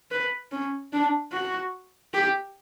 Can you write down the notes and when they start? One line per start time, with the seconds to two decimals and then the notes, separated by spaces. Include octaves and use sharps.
0.11 B4
0.51 C#4
0.93 D4
1.32 F#4
2.13 G4